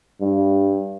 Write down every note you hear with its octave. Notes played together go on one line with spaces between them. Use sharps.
G2